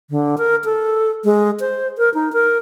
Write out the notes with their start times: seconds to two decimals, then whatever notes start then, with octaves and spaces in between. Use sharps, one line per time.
0.10 D3
0.38 A#4
0.64 A4
1.25 G#3
1.60 C5
1.98 A#4
2.14 D#4
2.33 A#4